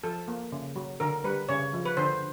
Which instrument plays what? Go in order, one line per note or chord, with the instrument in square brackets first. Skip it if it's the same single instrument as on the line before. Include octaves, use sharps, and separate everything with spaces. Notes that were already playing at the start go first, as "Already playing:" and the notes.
[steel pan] F3 A4
A#3
C#3
F#3
D3 A#4
G3 B4
C#3 C#5
F3
B4
D3 C5